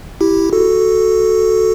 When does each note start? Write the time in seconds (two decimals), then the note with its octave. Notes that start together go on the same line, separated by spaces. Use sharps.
0.21 E4 G4
0.53 F#4 A4